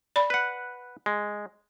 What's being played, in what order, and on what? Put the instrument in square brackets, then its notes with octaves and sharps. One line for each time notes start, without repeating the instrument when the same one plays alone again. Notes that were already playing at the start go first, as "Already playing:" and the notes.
[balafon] D5 B5
[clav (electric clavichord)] B4 F#5
G#3